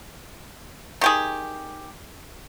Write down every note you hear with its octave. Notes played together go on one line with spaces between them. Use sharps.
D#3 G4 G#4